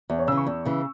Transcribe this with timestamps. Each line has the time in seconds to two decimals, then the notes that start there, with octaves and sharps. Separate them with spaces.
0.10 E2 E5
0.19 C#5
0.28 C#3 E3 E6
0.37 C#6
0.46 E2
0.65 C#3 E3